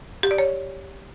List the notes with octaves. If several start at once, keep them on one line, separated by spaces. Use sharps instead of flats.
G4
D5
C#5